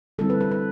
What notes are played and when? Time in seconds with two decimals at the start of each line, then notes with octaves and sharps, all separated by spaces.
0.18 D3 G3 C4 E4 A4
0.30 B4
0.41 B4
0.51 B4